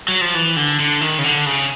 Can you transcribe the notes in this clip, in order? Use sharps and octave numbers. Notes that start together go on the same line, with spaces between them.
F#3
F3
E3
D3
D3
D#3
C#3
D3
C#3